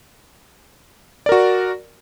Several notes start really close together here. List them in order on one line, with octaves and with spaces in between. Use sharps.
D5 A#4 F#4